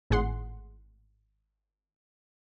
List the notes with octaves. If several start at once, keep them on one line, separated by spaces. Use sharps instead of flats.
G#1 A2 G#4 F#5 C6 C7